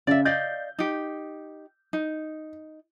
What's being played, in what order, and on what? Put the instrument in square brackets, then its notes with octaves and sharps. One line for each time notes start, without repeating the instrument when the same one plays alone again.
[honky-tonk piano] C#3 [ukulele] D5 E5
[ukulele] D5 D#5 F5 [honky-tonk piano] G6
[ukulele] D#4 G4
D#4